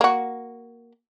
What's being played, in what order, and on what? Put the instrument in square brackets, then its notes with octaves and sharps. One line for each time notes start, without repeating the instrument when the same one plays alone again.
[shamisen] A#3 F#4